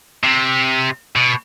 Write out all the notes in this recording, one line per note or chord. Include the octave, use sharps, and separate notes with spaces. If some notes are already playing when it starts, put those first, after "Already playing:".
C3
B2